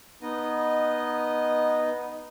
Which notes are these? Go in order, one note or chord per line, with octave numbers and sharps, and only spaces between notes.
B3 D#4 D#5